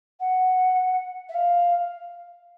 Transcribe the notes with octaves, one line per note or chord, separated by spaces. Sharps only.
F#5
E5
F5